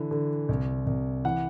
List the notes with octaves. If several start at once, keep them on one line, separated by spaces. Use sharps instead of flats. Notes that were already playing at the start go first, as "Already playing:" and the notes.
Already playing: D3 E3
D3
C2
C2
E3 F#5